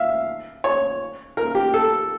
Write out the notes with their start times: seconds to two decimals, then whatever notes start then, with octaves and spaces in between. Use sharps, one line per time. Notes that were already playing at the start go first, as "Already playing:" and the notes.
Already playing: E5 F5
0.64 C#5
1.37 A#4
1.55 G4
1.74 A4